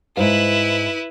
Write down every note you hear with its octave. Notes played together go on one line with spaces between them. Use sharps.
G#2 E4 B4 C5 F5